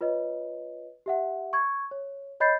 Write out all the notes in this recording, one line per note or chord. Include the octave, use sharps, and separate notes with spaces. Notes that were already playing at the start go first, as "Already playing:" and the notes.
F4 B4 C#5 D#5
G4 E5 F#5
C#6 G#6
C#5
C#5 D#5 B5 G6 A6 C7